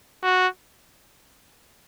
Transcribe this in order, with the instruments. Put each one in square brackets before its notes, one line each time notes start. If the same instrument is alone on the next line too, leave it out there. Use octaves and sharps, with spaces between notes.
[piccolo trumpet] F#4